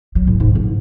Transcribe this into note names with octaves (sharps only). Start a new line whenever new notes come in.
F#3
A2
G#2
A1